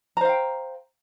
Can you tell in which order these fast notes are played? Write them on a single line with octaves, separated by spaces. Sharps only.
A#5 C5 F5 G5